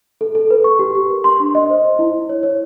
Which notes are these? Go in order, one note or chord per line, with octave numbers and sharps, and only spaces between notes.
A4
A4
B4
C#6
G4
G4
A#4
C6
D4
D#5
C5
C5
E4
E4
C#5
C#5